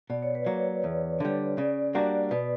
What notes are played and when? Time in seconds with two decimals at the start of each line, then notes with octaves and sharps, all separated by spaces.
0.10 B2 D5
0.22 C#5
0.35 B4
0.46 F#3 A#3 C#5
0.84 E2
1.20 D3 G3
1.57 C#3 D5
1.94 G3 A#3 D4 F#4 D5
2.31 B2 B4